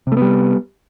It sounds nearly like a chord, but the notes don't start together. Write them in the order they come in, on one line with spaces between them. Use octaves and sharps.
C3 A3 B3 G3